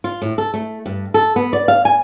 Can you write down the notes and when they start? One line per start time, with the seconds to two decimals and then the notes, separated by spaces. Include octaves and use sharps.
0.04 F4
0.22 A2
0.38 A4
0.54 A3
0.86 G2
1.14 A4
1.36 B3
1.53 D5
1.68 F5
1.85 G#5